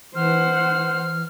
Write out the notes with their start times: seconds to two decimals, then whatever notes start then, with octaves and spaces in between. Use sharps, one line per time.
0.15 E3 C5 F#5 F6